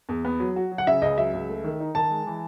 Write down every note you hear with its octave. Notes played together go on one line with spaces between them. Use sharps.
E2
B3
F#3
F#4
F#3
F#5
C#3 E5
C#2 D#5
F#3 E5
C#2
A3
D#3
D#4
D#3 A5
G#3
E3